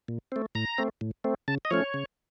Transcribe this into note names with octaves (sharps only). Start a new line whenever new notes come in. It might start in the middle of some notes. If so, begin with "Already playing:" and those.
A#2
A3 C4
A2 A#5
A3 C4
A2
A3 C4
C#3 A5
D#5
F3 A3 C#4 C#5
C#3